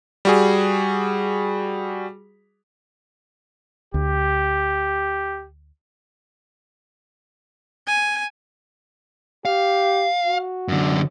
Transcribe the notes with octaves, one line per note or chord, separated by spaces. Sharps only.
G3 F#4 G#4
D2 G4
G#5
G4 F5
F#4
F#2 D3